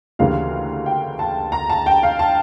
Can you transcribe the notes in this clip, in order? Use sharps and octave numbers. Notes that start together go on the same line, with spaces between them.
D2 C#3 E3 G3 A#3 F5
G5
A5
A#5
A5
G5
F5
A5